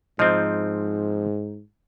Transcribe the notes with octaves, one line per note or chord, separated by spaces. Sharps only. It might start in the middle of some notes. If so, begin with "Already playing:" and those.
G#2 F3 C4 D#4